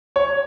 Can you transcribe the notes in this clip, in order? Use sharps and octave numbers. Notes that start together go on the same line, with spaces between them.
C#5